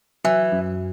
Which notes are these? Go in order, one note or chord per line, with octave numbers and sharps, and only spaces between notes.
E3 F#3
F#2